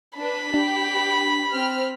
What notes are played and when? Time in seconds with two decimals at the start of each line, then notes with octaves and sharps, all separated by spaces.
0.17 D4 B4 B5
0.54 D4 G4
1.54 C4 F6